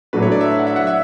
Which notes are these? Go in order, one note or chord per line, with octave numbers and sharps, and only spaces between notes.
A2 F#3 A3 D4 F#4 B4
C#5
D5
E5
F#5
E5
F#5
E5